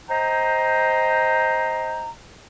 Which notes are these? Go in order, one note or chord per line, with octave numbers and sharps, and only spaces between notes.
C5 D#5 G5 A#5